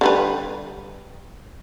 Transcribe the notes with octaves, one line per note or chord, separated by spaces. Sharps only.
D3 G3 B4